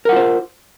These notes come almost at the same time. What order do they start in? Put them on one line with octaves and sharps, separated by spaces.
A#4 F#5 F4 C5